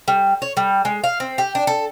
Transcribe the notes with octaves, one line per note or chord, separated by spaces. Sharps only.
G3
C#5
G3
G#3
F5
C4
G4
D4
A4